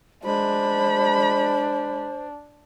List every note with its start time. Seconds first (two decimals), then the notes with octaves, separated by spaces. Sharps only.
0.24 G#3 D4 C5 B5